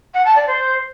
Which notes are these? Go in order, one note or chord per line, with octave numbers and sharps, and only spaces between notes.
F#5
A5
D5
C5